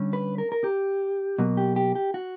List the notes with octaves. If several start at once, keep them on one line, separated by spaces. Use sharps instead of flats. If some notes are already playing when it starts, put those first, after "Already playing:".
Already playing: D3 G3 C#4
B4
A#4
A#4
G4
B2 F#3 A#3
G4
G4
G4
F#4